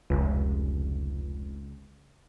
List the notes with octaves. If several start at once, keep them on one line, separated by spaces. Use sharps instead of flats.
F1 C#2